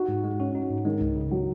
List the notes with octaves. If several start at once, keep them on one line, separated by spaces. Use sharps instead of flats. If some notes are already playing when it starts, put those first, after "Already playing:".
Already playing: D#4 F#4
G#2
G#3
C#4 F#4
D#4
G#2
D#3 G#3
C#2
C#3
F#3